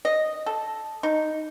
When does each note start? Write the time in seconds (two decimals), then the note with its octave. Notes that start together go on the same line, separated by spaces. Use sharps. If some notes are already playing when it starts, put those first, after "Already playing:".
0.05 D#5
0.46 A4
1.03 D#4